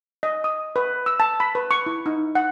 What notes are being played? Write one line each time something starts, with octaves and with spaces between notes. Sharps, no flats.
D#5
D#6
B4
E6
A5
B5
B4
C#6
E4
D#4
F#5